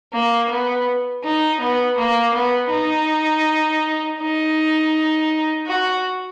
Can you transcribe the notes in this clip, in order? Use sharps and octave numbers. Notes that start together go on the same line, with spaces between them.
A#3
B3
D#4
B3
A#3
B3
D#4
D#4
F#4